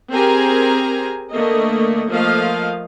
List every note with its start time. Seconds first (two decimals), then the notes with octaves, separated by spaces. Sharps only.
0.12 C4 G4 G#4 A#4 G#5 A#5
1.32 D3 A3 A#3 D#5
2.09 F3 A3 A#3 D#5 F5